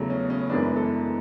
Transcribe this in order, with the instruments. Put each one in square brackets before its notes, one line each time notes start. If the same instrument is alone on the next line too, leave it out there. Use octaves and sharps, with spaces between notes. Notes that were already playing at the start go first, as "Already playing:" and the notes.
Already playing: [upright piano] E2 C#3 F#3 A3
C#4
C#4
F#2 E3 G#3 B3 D4
B4
A4